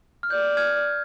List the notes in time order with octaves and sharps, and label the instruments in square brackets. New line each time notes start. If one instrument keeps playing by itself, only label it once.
[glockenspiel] F6
[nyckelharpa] D5 [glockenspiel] G6
[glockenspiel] F6 G#6